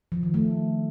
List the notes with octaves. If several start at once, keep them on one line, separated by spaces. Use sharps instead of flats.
F3
D#3
A3